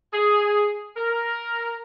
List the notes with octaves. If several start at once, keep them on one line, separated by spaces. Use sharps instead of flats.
G#4
A#4